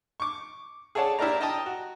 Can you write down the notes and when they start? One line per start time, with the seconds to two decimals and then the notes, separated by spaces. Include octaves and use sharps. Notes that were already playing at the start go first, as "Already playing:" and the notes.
0.20 C#6 D6
0.95 G#4 A4 C#5 D5 F#5 A5
1.19 D4 E4 G4 A#4 D5 A#5
1.41 D#5 G5 A5 A#5 D#6
1.66 F#4